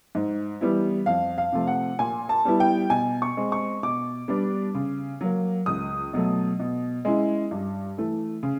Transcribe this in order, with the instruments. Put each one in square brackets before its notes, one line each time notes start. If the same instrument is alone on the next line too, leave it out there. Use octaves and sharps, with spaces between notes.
[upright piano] G#2
E3 G3 B3 E4
F2 F5
F5
C3 F3 A3
F#5
A#2 G#5
A5
G3 B3 E4
G5
B2 G#5
C#6
G#3 C4
C#6
B2 D6
G3 B3 D4
C#3
F#3 A#3
C#2 D#6
B2 F#3 A3
B2
G#3 C#4 E4
G2
E3 A3
C#3